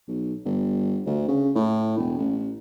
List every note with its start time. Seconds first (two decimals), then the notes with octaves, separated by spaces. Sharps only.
0.08 B1
0.45 G1
1.07 D2
1.28 C#3
1.55 A2
1.98 E1
2.19 A1